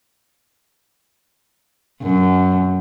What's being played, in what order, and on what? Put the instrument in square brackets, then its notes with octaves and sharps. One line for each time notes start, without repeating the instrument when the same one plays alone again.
[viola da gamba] F#2